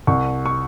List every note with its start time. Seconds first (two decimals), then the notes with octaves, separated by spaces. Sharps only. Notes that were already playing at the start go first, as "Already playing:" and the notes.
0.07 C2 C#6
0.46 C#6